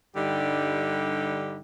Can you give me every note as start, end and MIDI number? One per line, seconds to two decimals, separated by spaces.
0.16 1.60 43
0.16 1.60 50
0.16 1.60 55
0.16 1.60 63
0.16 1.60 67